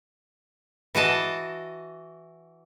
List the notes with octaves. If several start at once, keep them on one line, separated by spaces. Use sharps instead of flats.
E3 F#4 D#5 A5